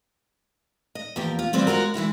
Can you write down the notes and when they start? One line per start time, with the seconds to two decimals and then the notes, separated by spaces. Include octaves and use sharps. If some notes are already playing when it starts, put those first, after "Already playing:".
0.95 D#5
1.16 E2 F3 A#3 G4
1.39 F4
1.53 E3 F3 G3 C4 D4
1.67 G#3 F4 F#4 A#4
1.94 E3 G#3 E4 F#4